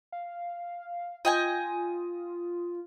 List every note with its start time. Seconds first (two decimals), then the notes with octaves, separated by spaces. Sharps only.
0.12 F5
1.25 F4 D#5 G5 G#5